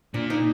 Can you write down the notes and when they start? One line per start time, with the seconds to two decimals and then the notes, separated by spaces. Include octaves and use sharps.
0.14 A#2 D4
0.30 D#4